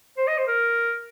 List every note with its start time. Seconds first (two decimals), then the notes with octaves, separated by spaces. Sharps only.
0.17 C5
0.27 D#5
0.38 C5
0.47 A#4